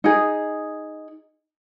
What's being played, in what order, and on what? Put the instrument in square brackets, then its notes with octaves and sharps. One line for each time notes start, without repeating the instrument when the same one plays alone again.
[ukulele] D#4 G#4